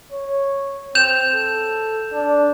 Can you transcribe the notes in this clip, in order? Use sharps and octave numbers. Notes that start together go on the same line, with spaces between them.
C#5
C4 G6 E7 F7
A4
D4